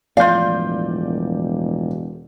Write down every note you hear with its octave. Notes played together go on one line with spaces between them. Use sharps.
E1 A2 F3 F4 D5 F5 G6